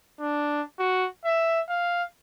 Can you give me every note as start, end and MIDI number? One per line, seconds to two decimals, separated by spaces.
0.20 0.62 62
0.79 1.07 66
1.24 1.61 76
1.69 2.03 77